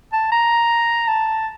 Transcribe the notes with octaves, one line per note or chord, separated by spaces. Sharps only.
A5
A#5
A5